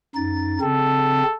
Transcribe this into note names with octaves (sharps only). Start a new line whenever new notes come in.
F#2 D#4 A6
C#3 C4 A4